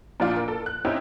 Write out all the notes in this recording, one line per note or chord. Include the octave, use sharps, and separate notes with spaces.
A#2 F3 D4 F4
A#4
A4
F#6
C4 C#4 D#4 E4 G4